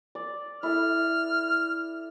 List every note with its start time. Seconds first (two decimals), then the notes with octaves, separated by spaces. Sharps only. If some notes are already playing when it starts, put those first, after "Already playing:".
0.15 D5
0.63 E4 A4 F6